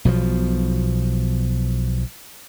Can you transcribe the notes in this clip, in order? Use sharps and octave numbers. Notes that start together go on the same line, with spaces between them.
B1 B2 E3 F3